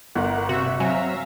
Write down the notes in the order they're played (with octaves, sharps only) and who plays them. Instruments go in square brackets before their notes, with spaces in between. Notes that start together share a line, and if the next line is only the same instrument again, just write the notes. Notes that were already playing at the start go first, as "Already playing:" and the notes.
[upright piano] G1 [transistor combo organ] A#4 F#5
[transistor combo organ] C3 [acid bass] F#4 [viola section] E5
[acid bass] F#3 [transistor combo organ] C4 [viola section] E5 F5 A#5 [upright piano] G#5